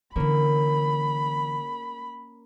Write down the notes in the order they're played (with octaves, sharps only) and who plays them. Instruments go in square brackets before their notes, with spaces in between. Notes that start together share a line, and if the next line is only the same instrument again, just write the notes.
[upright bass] D3 E3 [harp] A#3 C#4 [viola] B5